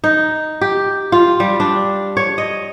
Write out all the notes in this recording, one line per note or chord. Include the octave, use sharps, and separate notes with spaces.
D#4
G4
F4
G3
D4
C#5
D#5